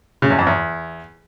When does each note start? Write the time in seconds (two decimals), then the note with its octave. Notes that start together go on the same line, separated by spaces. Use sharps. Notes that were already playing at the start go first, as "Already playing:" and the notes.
0.22 C#3
0.30 E2
0.39 F2
0.47 E2